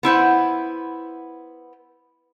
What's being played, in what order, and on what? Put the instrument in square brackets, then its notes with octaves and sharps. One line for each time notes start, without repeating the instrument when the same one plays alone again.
[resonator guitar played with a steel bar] B3 E4 C5 F#5